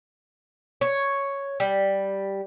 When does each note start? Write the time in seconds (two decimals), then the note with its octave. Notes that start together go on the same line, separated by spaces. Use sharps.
0.81 C#5
1.60 G3